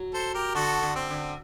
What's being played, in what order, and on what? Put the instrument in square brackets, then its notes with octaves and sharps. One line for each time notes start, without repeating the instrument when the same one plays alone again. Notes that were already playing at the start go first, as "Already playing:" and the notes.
Already playing: [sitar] F#3
[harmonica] A4 C5
G4 A#4
[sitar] D3 [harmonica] F#4 A4
[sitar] D3
[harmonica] C4
[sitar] D3